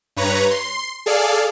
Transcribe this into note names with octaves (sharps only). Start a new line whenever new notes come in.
G2 B4 C#5 A#5
C6
G#4 A4 D5 F5